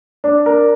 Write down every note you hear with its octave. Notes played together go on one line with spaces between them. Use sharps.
D4
A#4